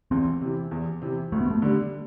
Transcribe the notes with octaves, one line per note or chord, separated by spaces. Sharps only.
E2 C4
C3 E3
E2
C3 E3
D2 A3
B3
A3
D3 G3